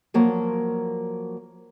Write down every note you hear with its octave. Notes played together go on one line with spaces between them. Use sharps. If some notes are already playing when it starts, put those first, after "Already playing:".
F3 F#3 A#3